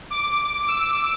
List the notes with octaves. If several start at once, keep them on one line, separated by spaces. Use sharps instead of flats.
D6
E6